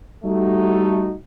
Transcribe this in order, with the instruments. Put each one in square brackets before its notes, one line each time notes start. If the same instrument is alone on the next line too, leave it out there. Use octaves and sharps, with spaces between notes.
[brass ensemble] G3 A3 D#4 F#4